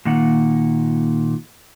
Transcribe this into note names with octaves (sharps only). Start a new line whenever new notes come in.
A#2 D#3 A#3 D#4 F#5